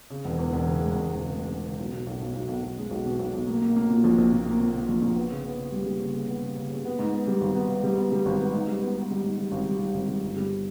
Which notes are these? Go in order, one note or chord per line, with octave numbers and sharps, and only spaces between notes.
C#3
E1
E2
E1
C#3
G#3
E1
E1
C#3
G#3
G#3
C#3
B1
B2
B1
B1
B1
B1
B1
G#3
B1
B2
B1
B1
A#3
A#3
A#3
A#2
A#1
A#1
A#2
A#3
A#2
A#2
A#1
A#1
B3
C#3
B3
C#3
G3
G3
C#3
C#3
B3
C#3
C#3
C#3
B3
G#2
B3
G3
G#1
B3
B3
G3
B3
G3
G#1
B3
G#2
G3
B3
B3
G3
G#2
G3
G#1
G3
G3
G#1
G3
G1
G3